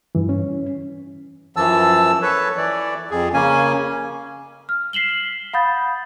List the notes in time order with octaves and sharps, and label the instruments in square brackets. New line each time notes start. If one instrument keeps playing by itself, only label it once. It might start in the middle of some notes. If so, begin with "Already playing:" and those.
[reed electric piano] G2 E3
C#4
[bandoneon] F#2 E3 F3 A5 E6
A4 B4 C#5
E3 D5
F2 G#4
C#3 A#3 C#4 G#5
[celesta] F6
B6 C7 E7 F#7 G7
F5 F#5 B5 D#6 G6 A6